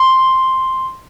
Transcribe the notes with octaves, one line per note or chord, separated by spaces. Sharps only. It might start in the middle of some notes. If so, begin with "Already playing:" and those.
Already playing: C6